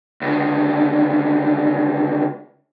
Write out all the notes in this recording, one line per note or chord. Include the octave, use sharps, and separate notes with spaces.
C#2 D3